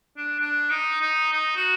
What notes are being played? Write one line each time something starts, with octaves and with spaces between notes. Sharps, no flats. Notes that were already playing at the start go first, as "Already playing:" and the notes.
D4
D4
D#4
D#4
D#4
F#4